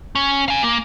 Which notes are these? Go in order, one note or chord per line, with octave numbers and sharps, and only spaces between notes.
C#4
F5 G#5
A#3